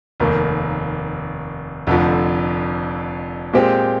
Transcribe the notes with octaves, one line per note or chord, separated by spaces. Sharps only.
F1 D#2 D#3 A#3
F1 F2 D3 F3
A#2 G#3 C4 G4